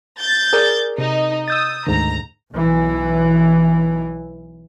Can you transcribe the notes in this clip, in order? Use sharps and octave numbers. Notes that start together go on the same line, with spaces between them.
G6 A6
G#4 A#4 D5
C3 D#4
D#6 E6 G6 A6
D2 G#2 D#3 A#5
B1 E3